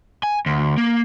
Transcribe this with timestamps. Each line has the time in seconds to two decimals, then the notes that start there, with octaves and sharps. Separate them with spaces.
0.23 G#5
0.46 D2
0.77 A#3